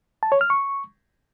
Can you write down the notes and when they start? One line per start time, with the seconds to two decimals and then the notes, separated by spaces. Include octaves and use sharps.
0.23 A5
0.32 C#5
0.41 F6
0.50 C#6